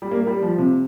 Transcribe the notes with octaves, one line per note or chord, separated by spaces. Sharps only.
G3
A#3
A#3
G3
F3
C3